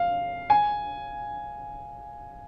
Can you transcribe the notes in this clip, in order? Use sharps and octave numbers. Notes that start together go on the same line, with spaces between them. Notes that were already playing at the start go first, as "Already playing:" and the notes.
Already playing: F5
G#5